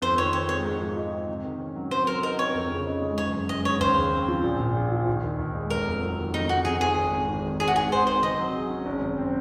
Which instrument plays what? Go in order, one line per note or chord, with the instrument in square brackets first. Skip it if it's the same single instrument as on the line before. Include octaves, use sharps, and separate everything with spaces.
[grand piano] F2 [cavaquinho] C5
[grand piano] D#3 [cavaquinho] C#5
[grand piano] C4 [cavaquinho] C#5
[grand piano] G#3 [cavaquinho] C#5
[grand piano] G#2
F3
D#4
C4
C3
D#3
C#4
F#3
[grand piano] C3 [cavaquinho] C5
[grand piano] F#3 [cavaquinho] A#4
[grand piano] D#4 [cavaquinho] A#4
[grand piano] C4 [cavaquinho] C#5
[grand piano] F2
C#3
D#4
G#3
[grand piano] F#1 [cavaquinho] C#5
[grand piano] F#2
[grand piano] G#3 [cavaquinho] D#5
[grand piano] C#3 [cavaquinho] C#5
[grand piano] D#2 [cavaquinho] C5
[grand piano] C#3
C4
F3
A#1
A#2
A#1
F3
D#2
D#3
D#2
G#3
[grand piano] F1 [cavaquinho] A#4
[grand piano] F2
F#3
D#3
[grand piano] F2 [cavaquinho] D#4
[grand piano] C3 [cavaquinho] F#4
[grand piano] F2 [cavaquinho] G#4
[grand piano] D#3 [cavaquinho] G#4
[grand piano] G#1
G#2
G#1
D#3
[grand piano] G#1 [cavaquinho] G#4
[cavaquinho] F#4
[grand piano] G#2 [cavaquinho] G#4
[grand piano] G#1 [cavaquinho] C5
[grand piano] D#3 [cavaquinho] C5
[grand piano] C3 [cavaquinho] D#5
[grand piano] F#3
G#4
C#4
G#1
F#2
C4